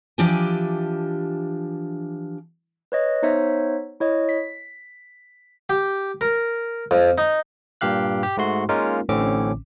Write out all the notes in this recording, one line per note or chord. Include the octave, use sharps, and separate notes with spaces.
E3 F3 D4 G4 E5 G#5
B4 C#5 D#5
B3 D#4 C5 C#5 E5
E4 C#5 D#5
B6
G4
A#4
F2
D#4
G2 A#2 G4 F5 F#6
G4
G#2 A3 F#4 C6
G#3 A#3 C#4 D#4 F4 A#4
A1 A2 D3 C4 C#4 D6